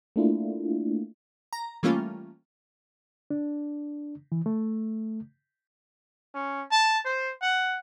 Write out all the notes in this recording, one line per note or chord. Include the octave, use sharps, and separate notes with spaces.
A3 A#3 D4 E4 F4
A#5
E3 G3 A3 A#3 C#4 F4
D4
E3
A3
C#4
A5
C5
F#5